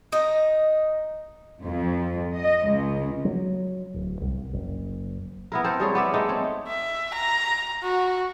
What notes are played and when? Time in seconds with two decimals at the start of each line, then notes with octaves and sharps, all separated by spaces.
0.12 D#4 D#5
1.63 F2
2.37 D#5
2.66 C#2
3.25 F#3
3.94 D1
4.21 C2
4.53 F#1
5.52 B3 E4 A#4
5.64 C4 A4 A#4 C5
5.80 G3 G#4 C#5
5.95 B3 D5 E5
6.14 G#3 A3 D#4 A4
6.29 C4 C#5
6.67 E5
7.14 A#5
7.83 F#4